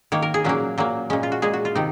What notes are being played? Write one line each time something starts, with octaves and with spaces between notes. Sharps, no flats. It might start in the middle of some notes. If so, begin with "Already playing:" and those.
D#3 A#3 C#5
A#4
G#4
A#2 F#3 A#3 C#4
A#2 F#3 A#3
A#2 G#3 C#4
F4
F#4
A#2 G#3 G#4
F#4
F4
C3 D#3 D#4